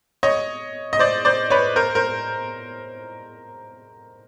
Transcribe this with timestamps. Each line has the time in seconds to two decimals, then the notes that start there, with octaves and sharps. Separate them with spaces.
0.23 C#5 D#5
0.93 D#5
0.99 C5 D5
1.25 C5 D5
1.50 B4 C#5
1.76 A#4 C5
1.95 A#4 C5